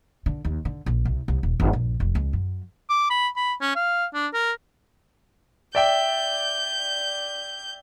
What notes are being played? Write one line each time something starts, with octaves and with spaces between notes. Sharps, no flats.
D3
D#2
D3
A#1
C2
C2
D#1
G1
A#1
F1
C#2
F#2
D6
B5
B5
C#4
F5
D4
A#4
D5 E5 G5 G6